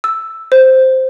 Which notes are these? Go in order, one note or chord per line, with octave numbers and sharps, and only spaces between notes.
E6
C5